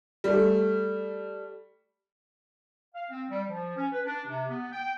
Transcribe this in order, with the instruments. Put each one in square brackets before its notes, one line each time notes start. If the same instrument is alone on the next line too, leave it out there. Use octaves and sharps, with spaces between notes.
[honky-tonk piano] G3 A3
[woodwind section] F5
C4
G3
F3
C#4
B4
D4
C3
B3
G5